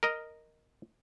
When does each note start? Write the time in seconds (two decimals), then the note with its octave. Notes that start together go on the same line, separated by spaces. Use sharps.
0.03 A#4 D#5